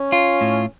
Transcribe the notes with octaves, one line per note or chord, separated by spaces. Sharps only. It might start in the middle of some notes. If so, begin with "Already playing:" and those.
Already playing: C#4
F4
A2